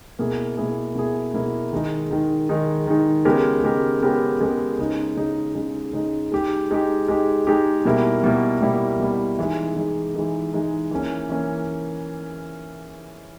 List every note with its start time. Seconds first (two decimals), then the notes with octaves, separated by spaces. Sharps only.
0.19 B2 A#3 E4 G#4
0.57 B2 A#3 E4 G#4
0.95 B2 A#3 E4 G#4
1.34 B2 A#3 E4 G#4
1.72 D#3 G#3 D#4
2.11 D#3 G#3 D#4
2.49 D#3 G#3 D#4
2.87 D#3 G#3 D#4
3.25 C#3 G#3 B3 G4 A#4
3.64 C#3 G#3 B3 G4 A#4
4.02 C#3 G#3 B3 G4 A#4
4.40 C#3 G#3 B3 G4 A#4
4.79 C#3 G#3 D#4
5.17 C#3 G#3 D#4
5.55 C#3 G#3 D#4
5.93 C#3 G#3 D#4
6.32 G#3 D#4 G4
6.71 G#3 D#4 G4
7.08 G#3 D#4 G4
7.47 G#3 D#4 G4
7.85 B2 G3 A#3 E4
8.24 B2 G3 A#3 E4
8.62 B2 G3 A#3 E4
9.00 B2 G3 A#3 E4
9.39 E3 G#3 D#4
9.77 E3 G#3 D#4
10.15 E3 G#3 D#4
10.53 E3 G#3 D#4
10.91 E3 A#3 C#4
11.29 E3 A#3 C#4